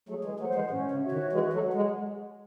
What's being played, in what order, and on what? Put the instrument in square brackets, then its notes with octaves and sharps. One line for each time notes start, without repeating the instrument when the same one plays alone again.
[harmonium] F#3 A3 [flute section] G#4
[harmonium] E3 G#3
[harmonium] F#3 A3 [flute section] F#5
[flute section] C5
[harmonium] E3 G#3
[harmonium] A2 [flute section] C#4
[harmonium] C#3
[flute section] F#4 C#5 E5
[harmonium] C3 D#3
[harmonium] E3 G#3 [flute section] F#4
[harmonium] F#3 A3
[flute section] C#5 F#5
[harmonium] G#3